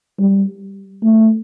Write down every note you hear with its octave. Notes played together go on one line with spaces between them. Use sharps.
G3
A3